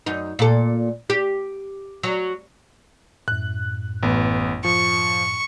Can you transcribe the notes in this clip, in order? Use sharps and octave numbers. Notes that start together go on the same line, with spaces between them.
F#2 D#4
A#2 A4
G4
F#3
F#2 A2 F#6
A1 B3
F3 C#6